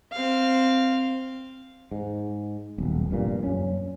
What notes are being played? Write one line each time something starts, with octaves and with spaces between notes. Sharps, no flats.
C4 F5
G#2
D#1 B1
F1 G2 A#2
F#2 C#4